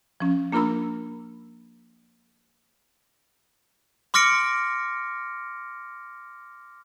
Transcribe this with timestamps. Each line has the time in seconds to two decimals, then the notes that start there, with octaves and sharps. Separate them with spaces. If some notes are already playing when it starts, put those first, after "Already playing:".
0.20 F3 C#4
0.52 A#3 D4 F4 A#4 B5 E6
4.14 C6 D6 F6 A#6 C#7 D7